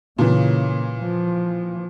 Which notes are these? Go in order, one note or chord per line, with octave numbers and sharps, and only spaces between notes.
A#2 C#3 E3 A#3
F3